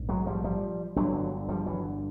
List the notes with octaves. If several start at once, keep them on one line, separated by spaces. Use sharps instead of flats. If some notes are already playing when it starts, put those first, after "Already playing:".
Already playing: A#1 G#2
F#3 G#3
F3 G3
F3 G3
G1 G2 D3 F#3
F3 G3
E3 F#3